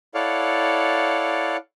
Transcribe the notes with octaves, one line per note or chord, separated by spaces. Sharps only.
E4 A4 C#5 D5 F5 F#5